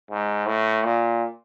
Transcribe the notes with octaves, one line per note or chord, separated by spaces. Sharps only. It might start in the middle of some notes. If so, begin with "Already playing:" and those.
G#2
A2
A#2